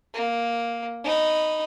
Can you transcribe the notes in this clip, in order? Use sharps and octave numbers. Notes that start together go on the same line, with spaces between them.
A#3
D#4 B5